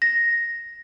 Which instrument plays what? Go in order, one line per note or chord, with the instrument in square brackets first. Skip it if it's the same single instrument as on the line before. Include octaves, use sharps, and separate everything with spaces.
[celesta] A#6